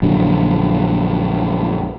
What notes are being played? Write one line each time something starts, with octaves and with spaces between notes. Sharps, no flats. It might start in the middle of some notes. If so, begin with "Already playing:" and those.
A#1 F#2 D3 F#3